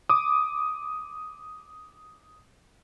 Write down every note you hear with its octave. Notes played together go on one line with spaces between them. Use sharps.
D6 D#6